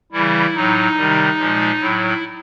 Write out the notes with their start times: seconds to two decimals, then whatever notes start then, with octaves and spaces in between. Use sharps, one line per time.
0.12 C#3 E3 G3 E4
0.55 A2 F#3 D#4
0.97 C3 D#3 G3
1.38 A#2 F3 G#3
1.80 A2 F#3 E4